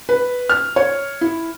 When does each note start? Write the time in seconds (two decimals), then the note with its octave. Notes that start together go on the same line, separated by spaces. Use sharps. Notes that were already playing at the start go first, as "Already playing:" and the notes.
0.09 B4
0.49 F6
0.76 C#5
1.21 E4